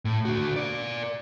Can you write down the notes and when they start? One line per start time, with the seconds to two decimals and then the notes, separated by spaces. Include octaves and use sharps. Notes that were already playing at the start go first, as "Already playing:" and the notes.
0.05 A2
0.25 D3 F#4
0.56 A#4 D5